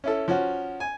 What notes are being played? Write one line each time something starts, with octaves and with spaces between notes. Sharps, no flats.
C#4 E4 A4
F3 C#4 F#4
G#5